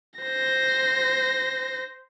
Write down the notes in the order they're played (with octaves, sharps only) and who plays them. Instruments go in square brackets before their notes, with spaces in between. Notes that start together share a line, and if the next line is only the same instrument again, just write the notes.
[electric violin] C5 A#6